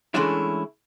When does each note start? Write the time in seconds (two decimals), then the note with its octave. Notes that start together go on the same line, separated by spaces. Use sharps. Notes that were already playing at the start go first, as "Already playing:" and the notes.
0.14 E3 G#3 A3 C#4 D4 E4